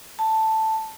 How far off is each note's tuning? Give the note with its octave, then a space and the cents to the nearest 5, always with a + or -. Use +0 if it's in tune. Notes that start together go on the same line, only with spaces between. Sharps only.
A5 +5